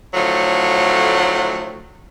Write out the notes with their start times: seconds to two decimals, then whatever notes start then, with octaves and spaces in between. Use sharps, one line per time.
0.14 A2 D3 F3 F#3 A3